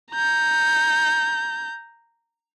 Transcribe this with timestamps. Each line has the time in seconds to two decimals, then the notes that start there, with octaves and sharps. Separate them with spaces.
0.12 A#5 G6